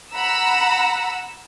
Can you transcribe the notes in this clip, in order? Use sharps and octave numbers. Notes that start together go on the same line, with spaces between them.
F#5 A#5 B5 E6